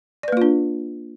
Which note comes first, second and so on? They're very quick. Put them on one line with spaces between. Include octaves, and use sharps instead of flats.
D5 B4 A#3 F4 D4